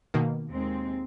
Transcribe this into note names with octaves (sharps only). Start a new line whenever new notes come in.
B2 D#3 A#3
D#2 G#3 C4